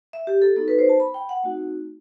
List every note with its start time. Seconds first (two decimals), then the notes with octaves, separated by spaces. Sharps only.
0.13 E5
0.27 G4
0.42 A4
0.56 B3 D#4 F#4 A4
0.68 B4
0.79 C5
0.89 A5
1.00 B5
1.14 G5
1.29 F#5
1.43 A3 C4 D#4 F#4